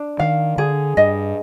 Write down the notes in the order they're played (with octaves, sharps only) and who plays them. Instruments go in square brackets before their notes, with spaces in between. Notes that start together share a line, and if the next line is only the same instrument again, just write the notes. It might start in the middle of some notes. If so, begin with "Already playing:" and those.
Already playing: [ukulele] D4
[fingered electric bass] D#3 [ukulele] F5
[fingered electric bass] D3 [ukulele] G#4
[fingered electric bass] G2 [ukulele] D#5